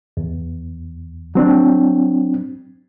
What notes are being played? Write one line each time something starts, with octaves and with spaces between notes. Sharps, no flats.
E2
F#3 C4 D4